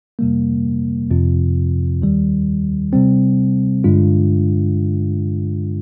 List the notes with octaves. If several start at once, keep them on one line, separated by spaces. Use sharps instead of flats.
F2 C3 G3 A#3
F2 C3 F3 C4 F4
D#2 D#3 G3
C3 G3 C4
G2 D3 G#3 D4 F4